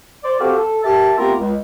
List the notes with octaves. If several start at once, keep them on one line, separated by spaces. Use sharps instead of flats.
C5 D5
C4 F#4 G4 A4 C5 F5
A4
G4 A#4 E5 A5
A3 B3 C4 F4 G4 A#4
C#2